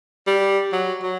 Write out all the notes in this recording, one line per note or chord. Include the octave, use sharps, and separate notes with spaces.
G3
F#3
F#3